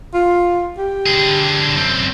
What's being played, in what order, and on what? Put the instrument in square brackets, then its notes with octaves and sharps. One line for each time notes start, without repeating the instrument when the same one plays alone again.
[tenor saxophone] F4
G4
[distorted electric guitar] D3 G#4
F#2 C4